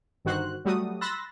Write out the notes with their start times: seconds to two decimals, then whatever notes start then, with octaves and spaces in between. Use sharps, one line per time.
0.25 G1 G2 D#3 F#4 C5 F#6
0.65 F#3 G3 A3 F#4 D#6
1.01 B5 C6 E6 F#6 A6 A#6